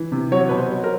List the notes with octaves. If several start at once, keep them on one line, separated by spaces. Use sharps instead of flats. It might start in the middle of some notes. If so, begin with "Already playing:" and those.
Already playing: E3
C3
F#3 C#5
B2 B4
C5
F#3
A#4